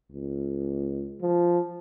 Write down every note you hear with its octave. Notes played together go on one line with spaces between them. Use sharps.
C#2
F3